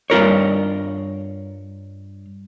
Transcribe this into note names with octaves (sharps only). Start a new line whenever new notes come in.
G2 F4 A#4 C#5